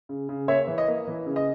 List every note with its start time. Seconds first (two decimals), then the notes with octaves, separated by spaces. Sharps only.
0.09 C#3
0.29 C#3
0.48 A#3 C#5 E5
0.67 E3
0.78 D#5
0.88 A#3
1.07 E3
1.26 C#3
1.36 D#5